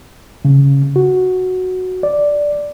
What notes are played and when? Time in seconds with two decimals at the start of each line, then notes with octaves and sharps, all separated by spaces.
0.45 C#3
0.96 F#4
2.03 D5